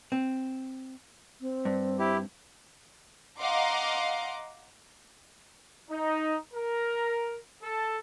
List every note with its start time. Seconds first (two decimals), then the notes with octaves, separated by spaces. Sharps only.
0.12 C4
1.41 C4
1.65 G2
1.99 E4 G4
3.40 D#5 F5 F#5 A#5 C6 D6
5.91 D#4
6.54 A#4
7.63 A4